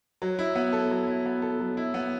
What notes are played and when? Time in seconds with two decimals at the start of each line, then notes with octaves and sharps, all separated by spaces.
0.22 F#3
0.39 E4
0.55 B3
0.73 A4
0.91 F#3
1.08 E4
1.26 B3
1.42 A4
1.60 F#3
1.77 E4
1.94 B3